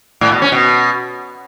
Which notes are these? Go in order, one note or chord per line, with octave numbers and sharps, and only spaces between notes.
A2
B2
C#4
B2